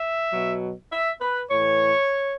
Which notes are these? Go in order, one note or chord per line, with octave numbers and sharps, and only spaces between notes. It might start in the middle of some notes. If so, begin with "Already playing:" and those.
Already playing: E5
B2 F#3
E5
B4
A2 E3 C#5